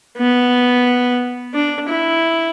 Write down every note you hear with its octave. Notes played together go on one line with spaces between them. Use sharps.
B3
D4
E4